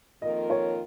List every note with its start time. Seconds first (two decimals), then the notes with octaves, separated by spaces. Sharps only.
0.22 F2 D#3 A#3 F4 A#4 D#5
0.50 C#5